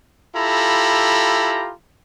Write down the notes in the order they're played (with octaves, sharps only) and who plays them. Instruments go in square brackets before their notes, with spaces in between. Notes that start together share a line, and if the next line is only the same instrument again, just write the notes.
[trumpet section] E4 F4 G4 A4 A#5 B5